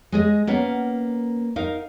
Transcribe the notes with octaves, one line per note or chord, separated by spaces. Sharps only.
G#3 G#4 D#5
A#3 B3 C#4
D#4 A#4 F5